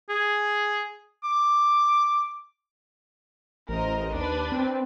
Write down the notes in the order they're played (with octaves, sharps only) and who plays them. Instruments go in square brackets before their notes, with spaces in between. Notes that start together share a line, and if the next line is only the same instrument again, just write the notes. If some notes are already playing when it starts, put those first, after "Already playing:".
[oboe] G#4
D6
[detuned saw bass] A1 [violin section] A#4 C5 D#5
[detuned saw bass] D#2 [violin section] D4 B4
[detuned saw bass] C4